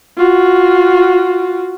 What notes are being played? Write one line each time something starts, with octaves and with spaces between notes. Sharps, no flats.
F4 F#4